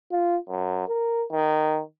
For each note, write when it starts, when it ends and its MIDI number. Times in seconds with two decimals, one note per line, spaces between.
0.11 0.36 65
0.49 0.84 42
0.88 1.24 70
1.31 1.80 51